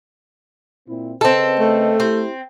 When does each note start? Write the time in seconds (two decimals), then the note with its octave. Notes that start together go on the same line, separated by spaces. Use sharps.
0.87 A#2 C4 E4
1.21 C#3 C4 A4 B4 D#5
1.60 A3
2.00 C4 E4 G4